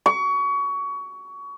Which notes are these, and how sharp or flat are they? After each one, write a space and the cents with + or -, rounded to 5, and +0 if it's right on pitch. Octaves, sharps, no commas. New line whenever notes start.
C#6 +25